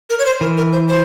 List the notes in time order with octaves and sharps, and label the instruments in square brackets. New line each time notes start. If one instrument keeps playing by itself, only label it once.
[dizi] A#4
C#5
C5
[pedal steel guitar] E3 [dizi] A#4
[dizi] A#4
C5
C5